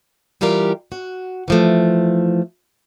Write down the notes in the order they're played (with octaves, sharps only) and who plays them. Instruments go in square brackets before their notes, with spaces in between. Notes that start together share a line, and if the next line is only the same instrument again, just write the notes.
[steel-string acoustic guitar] E3 G3 F4 G4 A#4
F#4
E3 F3 A3